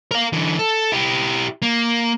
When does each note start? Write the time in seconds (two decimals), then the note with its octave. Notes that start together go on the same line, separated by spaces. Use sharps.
0.11 A#4 F5
0.33 D3 E3
0.59 A4
0.92 E4 G4
1.62 A#3